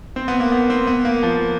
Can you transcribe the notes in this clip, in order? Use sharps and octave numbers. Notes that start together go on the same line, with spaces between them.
C4
B3
A#3
B3
C4
B3
A#3
F3